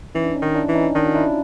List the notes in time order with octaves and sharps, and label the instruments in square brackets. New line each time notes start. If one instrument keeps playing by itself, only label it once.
[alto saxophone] E3 [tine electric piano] C#4 D#4
[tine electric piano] D4
C#4 D#4
[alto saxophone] D#3
[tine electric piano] D4 E4
[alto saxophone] E3
[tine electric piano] C#4 D#4
[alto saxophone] D#3 [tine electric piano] D4
[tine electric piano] F4
D4 E4